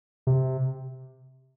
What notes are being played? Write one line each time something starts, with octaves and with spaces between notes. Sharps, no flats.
C3